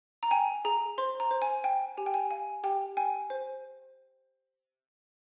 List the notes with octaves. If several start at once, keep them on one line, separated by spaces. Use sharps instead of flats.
A#5
G5 G#5
G#4 A#5
C5 C6
A#5
C5
G#5
G5
G4 G#5
G5
G#5
F5 G#5
G4 G5
G5 G#5
C5